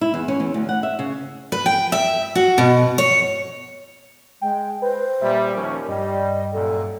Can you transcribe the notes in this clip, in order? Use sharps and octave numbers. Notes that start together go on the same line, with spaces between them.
E4
E2
C#4
E2
D2
F#5
E5
C#3
B4
G5
E5
F#4
B2
C#5
G#3 G5
B4 C5
A#2 G3 E5
D#2 F3 C#4 A#4
G2 G3 D#5
F#2 A#2 A4